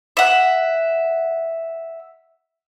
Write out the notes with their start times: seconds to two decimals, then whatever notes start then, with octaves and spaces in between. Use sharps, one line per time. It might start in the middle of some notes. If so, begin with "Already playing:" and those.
0.17 E5 F#5